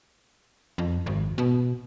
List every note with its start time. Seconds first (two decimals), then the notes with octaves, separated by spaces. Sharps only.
0.78 F2
1.06 G#1
1.38 B2